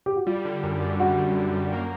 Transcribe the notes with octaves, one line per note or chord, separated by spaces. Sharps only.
G4
F#4
G3 F4
D3
F#2
F#2
G3 F#4
D3
F#2
F#2
A#3